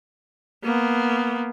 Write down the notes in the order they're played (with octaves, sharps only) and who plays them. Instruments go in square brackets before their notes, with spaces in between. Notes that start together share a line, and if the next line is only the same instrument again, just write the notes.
[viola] A#3 B3